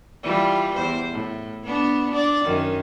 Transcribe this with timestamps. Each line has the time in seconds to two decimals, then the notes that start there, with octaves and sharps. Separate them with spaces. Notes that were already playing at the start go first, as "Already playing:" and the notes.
0.23 E3 G3 F4
0.75 E2 C5
1.12 A2
1.64 B3 D4
2.11 D4 D5
2.45 F#2 D#3